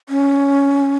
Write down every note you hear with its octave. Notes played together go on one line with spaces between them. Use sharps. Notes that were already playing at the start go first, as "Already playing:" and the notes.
C#4